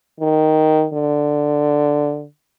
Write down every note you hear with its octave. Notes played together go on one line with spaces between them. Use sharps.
D#3
D3